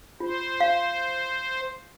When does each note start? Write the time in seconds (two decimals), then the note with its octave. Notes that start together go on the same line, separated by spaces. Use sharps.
0.20 F4 C5
0.60 F5